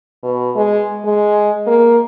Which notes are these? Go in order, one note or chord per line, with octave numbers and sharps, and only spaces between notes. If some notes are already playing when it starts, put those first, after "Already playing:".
B2
G#3
G#3
A#3